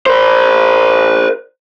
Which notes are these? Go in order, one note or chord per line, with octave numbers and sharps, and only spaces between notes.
A#4 C5